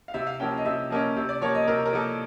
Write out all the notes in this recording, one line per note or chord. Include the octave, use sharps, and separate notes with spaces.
F5
C3 E5
F5
F3 A#3 C#4 G5
D#5
C3 E5
F3 A#3 C#4 D#5
C3
D5
F3 A#3 C#5
D#5
C3 A#4
A#4
F3 A#3 A4